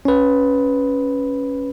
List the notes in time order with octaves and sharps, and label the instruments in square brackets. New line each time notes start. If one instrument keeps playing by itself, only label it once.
[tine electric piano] C#4 B4